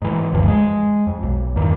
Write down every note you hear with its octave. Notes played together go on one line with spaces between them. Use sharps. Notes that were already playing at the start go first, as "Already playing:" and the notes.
G#2 E3
F#1 D2 G2 F3
G#3
F2
B1
E2 G2 D#3